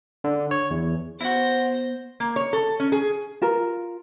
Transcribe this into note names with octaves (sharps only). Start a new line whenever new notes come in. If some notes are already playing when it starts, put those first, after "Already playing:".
D3
C#5
E2
B3 E4 F#4 C5 G6 A#6
A#3
C#5
A4
C#4
G#4
F4 A#4